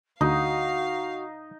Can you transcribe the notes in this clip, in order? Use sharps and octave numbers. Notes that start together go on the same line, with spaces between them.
D2 D#4 F#4 F5